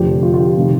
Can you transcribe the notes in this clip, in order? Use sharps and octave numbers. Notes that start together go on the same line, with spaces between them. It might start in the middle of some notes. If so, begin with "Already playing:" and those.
Already playing: F1 F2 D3 G4
F4
F4
G4
C3 D#3